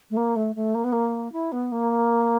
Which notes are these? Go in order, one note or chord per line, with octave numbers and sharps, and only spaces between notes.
A3
A#3
A3
A3
A#3
B3
A#3
E4
B3
A#3